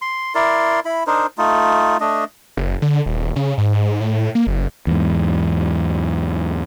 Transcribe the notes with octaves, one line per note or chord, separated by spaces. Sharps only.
C6
E4 A#4 D5 C6
E4 B5
D4 D#4 A#4 C5
A3 D#4 F4
A3 D4 D#5
F#1
D3
D#1
C#3
G#2
A2
A#3
F#1
E2 G#2